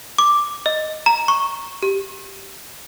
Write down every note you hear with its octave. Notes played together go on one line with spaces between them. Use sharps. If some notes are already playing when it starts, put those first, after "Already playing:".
D6
D#5
A#5
C#6
G4